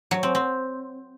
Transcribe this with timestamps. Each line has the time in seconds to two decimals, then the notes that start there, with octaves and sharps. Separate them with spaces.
0.11 F#3
0.23 C4
0.35 C4